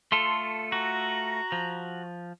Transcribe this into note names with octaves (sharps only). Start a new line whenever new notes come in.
A3 F4 A4 C6
F#4 A#5
F3